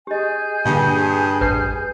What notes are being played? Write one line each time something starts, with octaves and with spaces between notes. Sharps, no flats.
G4 G#4 D#5 G#5 G6
G2 A#2 D3 F5
A1 F2 B4 C7